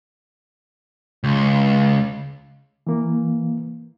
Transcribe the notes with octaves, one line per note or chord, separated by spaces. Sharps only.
C#2
E3 A#3